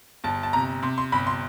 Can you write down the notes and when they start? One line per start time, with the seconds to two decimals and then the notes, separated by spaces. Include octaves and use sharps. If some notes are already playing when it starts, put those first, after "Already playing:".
0.24 G1 A5
0.43 A5
0.53 C3 A#5
0.83 C3 C6
0.98 C6
1.12 G1 B5
1.27 C6